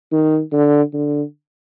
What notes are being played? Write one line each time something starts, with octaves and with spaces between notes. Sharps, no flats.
D#3
D3
D3